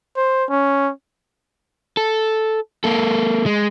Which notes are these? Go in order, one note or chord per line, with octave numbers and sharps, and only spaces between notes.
C5
C#4
A4
A#3 A4
G#3